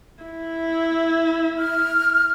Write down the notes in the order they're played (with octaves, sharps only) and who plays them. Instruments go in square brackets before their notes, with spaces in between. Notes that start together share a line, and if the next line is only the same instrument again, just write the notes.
[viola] E4
[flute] F6